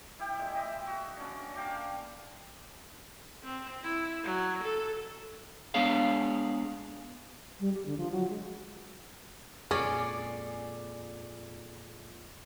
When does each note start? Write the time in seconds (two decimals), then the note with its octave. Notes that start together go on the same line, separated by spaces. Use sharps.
0.19 E4 G4 G5
0.38 A#2 G#3
0.55 D#5 E5 G5
0.87 F#4
1.16 D3 C#4
1.55 A#3 F5 G5 D6
3.43 C4
3.83 E4
4.24 F#3
4.63 A4
5.74 G#3 B3 D4 G#4 C#5 F5
7.60 G3
7.74 G4
7.86 D3
7.97 F3
8.12 F#3
8.30 G#3
9.71 F2 A#2 C#4 G#4 D5